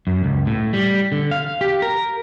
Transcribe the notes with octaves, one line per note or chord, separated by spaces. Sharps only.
F#2
C#2
A2
G3
D3
F5
G4
A#4